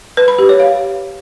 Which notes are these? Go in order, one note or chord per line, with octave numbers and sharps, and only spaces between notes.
B4
B5
G4
C#5
F5